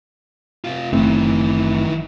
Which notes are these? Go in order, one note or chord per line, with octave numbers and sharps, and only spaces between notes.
C3 F4
F#1 D#3 E3 A3 C4